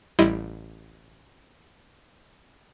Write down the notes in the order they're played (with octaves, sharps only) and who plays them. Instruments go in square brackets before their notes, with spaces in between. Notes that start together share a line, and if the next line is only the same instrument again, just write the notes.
[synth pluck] A1 G3 E4 D#5 C6